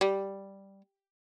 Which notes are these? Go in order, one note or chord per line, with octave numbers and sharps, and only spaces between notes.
G3